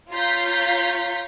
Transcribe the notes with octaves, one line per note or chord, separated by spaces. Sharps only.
F4 C#5 F5 A#5 G6 B6